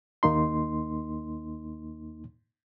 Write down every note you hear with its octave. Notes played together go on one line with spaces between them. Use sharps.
D#2 A#3 D#4 C6